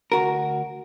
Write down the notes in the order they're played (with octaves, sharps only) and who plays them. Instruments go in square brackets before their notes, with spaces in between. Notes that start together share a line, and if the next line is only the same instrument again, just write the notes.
[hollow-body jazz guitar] D2 F#4 A#4